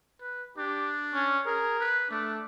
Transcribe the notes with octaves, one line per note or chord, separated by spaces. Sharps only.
B4
D4 G4
C#4
G#4 A#4
B4
A3 D4